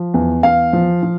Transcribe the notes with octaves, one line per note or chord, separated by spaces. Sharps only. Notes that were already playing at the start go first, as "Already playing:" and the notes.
Already playing: F3
E2
E2 F5
F3
F3